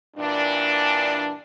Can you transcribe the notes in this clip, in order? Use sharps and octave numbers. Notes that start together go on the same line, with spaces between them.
G2 A#2 E3 D4